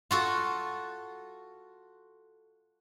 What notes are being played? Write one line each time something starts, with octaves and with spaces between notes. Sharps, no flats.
F4 F#4 A4